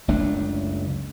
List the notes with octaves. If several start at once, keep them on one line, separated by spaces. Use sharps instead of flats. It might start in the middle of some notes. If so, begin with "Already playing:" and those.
F#1 C#2 A3 D4